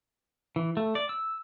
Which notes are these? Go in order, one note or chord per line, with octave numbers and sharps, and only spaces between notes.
E3
A3
D5
E6